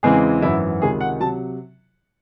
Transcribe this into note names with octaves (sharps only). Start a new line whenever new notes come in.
E2 C#3 E3 G#3 C4 G#4
G#1 F#2 E3 E4
C#2 C3 D#3 G#3 G#4
F#5
C3 F#3 A5